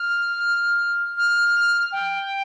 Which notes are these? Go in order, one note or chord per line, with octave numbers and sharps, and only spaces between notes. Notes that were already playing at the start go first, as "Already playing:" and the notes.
Already playing: F6
F6
G5